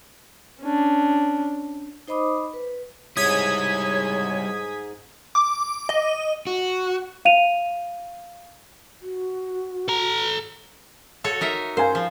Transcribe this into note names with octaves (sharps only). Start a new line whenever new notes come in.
C#4 D4
D#4 C5 D#5 B5 D6 D#6
B4
G#2 G3 E4 G#4 C#5 D#6 G#6 B6
D6
D#5
F#4
F5 D#7 F7
F#4
A4 A#5
F#4 A4 C#5
D#4 A#4 E5
A#4 C5 F5 G#5
F3